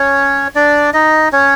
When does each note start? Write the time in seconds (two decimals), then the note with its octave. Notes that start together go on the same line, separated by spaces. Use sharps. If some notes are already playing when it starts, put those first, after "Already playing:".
Already playing: C#4 C#5
0.55 D4 D5
0.94 D#4 D#5
1.32 C#4 C#5